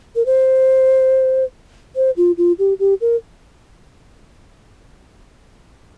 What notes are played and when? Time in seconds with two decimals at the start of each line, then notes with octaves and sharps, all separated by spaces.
0.16 A#4
0.26 C5
1.96 C5
2.17 F4
2.38 F4
2.59 G4
2.79 G4
3.01 A#4